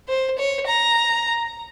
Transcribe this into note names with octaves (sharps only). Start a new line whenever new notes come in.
C5
C#5
A#5